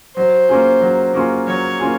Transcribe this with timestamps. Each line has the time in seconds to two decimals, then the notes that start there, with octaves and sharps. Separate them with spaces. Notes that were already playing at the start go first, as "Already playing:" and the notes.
0.16 F#3 C5
0.49 A#3 C#4 F4 G#4
0.81 F#3
1.14 A#3 C#4 F4 G#4
1.47 F#3 C#5
1.79 A#3 C#4 F4 G#4